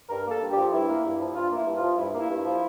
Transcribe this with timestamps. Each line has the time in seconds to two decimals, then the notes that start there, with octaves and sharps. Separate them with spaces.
0.10 G2 A#4
0.25 A#3
0.31 A4
0.42 G2
0.51 G4
0.57 F3
0.72 G2 E4
0.88 A#3
1.04 G2
1.20 F3
1.35 G2 F4
1.51 A#3
1.56 E4
1.67 G2
1.77 F3 F4
1.98 G2 E4
2.14 A#3
2.20 E4
2.29 G2
2.45 F3